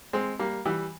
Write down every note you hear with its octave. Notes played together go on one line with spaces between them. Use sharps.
G#3 C4
G3 A#3
E3 G3